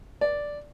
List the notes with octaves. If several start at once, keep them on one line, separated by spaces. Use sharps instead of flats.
D5